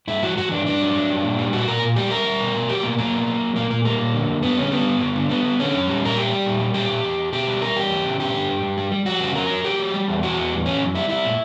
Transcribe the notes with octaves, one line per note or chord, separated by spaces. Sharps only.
G2 E4
E3 F#4
E3 F#4
G2 D4
G2 D4
F#3
F#3
G2
A#2
G3
A#2 F#4
A#2 A#4
A#2
G3 G4
G3 A#4
G3
B2
B2
F#3 G4
B2 A#3
F#3 A#3
B2
F#3
F#3
A#2 A#3
A#2 A#3
G3 A#3
A#2
D3
F#2
G3 B3
D3 C#4
G3 B3
G2
G2
D3
G3 B3
G3
D3 C#4
F#2
G3
A#2 A#4
G3 G4
G3
A#2
G3
A#2 G4
A#2
E2
E2
B2 G4
G3
G3 A#4
E2 G4
E3
C#3
G2 G4
D3
G2
G2
G3
G3
G3 F#4
C#3
F#3 A#4
F#3
F#3 G4
F#3
G3
E2
E3 F#4
E2
G3
E3 C#4
F#2
G3 E4
G3 E4
A#2